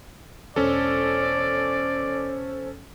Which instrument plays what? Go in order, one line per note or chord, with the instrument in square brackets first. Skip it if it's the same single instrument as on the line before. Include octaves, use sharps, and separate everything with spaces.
[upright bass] E1 [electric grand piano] C#4 A4 [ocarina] C5 [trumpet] D5